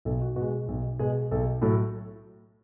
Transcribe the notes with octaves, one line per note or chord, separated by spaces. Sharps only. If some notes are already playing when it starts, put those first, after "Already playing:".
B1 A4
F#4
B2 F#4
G#3
B1
B2 G#3 G#4
B1 A4
A2 F#3 A4